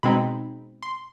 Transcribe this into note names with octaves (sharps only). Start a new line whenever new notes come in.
B2 G#3 C4 D#4 B5
C6